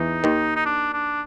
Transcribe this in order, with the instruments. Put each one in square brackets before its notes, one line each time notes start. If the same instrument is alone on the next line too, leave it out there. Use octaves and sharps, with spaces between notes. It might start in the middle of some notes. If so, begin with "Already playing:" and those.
Already playing: [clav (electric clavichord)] E2 E3 [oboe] D#4
[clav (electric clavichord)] D#2 D#3
[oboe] D#4
D4
D4